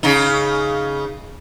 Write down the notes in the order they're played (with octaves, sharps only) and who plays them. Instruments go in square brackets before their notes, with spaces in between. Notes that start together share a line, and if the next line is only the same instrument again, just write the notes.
[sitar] C#3 D#4